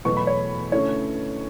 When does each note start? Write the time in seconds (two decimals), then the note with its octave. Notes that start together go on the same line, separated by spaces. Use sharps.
0.05 E2 B2 F#3 A3 C#6
0.17 B5
0.27 C#5
0.72 D3 A3 C#4 E4 C#5